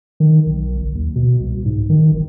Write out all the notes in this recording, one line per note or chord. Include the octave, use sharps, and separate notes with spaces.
D#3
B1
G1
D#2
B2
C2
G#2
D#3
G#1